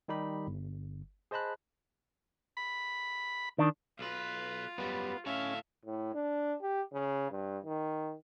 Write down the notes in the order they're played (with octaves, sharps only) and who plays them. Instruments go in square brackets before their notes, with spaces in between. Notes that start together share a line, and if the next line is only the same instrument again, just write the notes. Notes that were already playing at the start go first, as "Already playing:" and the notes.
[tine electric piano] D#3 G3 D#4 G4 B5
G1
G#4 C5 D#5 A5 B5 F#6
[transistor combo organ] B5
[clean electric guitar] D#3 D4
[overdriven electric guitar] B1 B4 [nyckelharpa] F4
[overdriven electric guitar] F#2 G3 [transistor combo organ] B3
[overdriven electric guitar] A2 F5 [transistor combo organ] C#4 [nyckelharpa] E5
[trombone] A2
D4
G4
C#3
G2
D#3